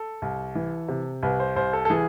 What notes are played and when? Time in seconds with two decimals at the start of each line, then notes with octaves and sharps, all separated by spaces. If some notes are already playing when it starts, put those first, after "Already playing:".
Already playing: A4
0.22 C2
0.55 E3
0.88 C3
1.23 C2 B4
1.40 C5
1.56 C2 C5
1.73 A4
1.85 A4
1.90 E3 G#4